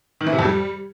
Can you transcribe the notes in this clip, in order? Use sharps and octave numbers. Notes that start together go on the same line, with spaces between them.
D#3
E3
C3
F2
G3